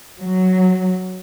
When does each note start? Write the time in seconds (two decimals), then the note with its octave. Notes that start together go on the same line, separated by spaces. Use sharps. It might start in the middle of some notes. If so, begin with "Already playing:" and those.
0.22 F#3